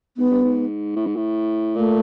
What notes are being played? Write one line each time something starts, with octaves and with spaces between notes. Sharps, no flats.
G#2 B3
G2
G#2
A2
G#2
A2
A#2 A3